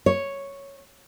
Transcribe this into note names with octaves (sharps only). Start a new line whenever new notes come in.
C#5